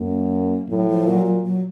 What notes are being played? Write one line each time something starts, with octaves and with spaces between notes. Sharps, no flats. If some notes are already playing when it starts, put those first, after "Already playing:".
Already playing: F#2 A#3
A2 F#3
F3
A#2 F#3
F#3
F#3